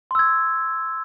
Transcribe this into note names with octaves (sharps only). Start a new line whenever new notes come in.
C6 E6 G#6